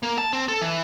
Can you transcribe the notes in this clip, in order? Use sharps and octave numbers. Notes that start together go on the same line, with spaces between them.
A#3
A5
C4
A4
E3